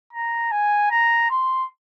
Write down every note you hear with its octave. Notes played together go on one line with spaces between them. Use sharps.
A#5
G#5
A#5
C6